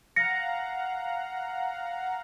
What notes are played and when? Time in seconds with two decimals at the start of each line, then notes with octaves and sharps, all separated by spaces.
0.16 F5 F#5 A#5 A#6 C#7